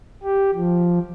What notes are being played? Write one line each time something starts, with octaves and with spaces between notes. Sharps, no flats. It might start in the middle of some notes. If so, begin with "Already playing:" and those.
G4
F3